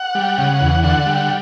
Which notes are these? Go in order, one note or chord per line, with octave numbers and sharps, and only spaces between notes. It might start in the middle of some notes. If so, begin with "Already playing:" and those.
Already playing: F#5
G3
C#3
E2
D3 F#5
G3